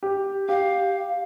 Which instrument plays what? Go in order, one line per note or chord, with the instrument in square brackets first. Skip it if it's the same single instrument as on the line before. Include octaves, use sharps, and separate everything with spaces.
[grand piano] G4
[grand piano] G4 [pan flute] F5